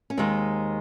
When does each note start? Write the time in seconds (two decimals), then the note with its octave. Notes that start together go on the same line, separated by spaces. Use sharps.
0.10 C#4
0.17 D#2 D#3 G#3 C4